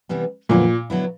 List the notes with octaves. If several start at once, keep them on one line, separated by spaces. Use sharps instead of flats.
C3 E3 G3 B3
F2 A#2 D3 F#3 B3 E4
D3 F#3 B3 E4